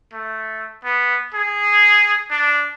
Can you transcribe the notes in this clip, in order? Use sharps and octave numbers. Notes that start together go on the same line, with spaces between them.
A3
B3
G#4
D4